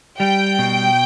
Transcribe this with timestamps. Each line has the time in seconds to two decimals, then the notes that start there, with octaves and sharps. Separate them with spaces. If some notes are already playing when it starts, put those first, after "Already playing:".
0.20 G3 G5
0.59 B2